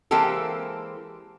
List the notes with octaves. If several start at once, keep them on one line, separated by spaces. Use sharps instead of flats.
E3 G#3 A#3 C4 G4 A4